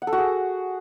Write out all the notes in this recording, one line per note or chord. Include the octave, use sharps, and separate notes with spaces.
F#5
A4
F#4
G#4